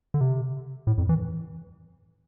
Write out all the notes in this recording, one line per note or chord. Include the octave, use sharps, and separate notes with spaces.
D3
C3
A2
F2
E3